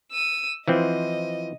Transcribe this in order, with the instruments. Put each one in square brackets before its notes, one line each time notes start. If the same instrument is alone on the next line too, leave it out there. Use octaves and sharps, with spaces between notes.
[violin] E6 D#7
[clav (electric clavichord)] E3 F3 C4 [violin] D#5